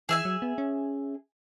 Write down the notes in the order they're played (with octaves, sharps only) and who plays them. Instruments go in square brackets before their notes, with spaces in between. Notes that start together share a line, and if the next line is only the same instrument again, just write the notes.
[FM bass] E3 [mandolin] G#4 E5 G#5
[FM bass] F#3
B3
C#4